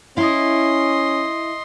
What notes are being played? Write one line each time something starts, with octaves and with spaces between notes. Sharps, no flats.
C#4 E4 D#5 F5 C6